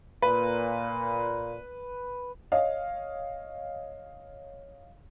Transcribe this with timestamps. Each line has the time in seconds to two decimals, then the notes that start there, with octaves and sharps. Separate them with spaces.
0.22 A#2 B4
2.52 C#5 D#5 F5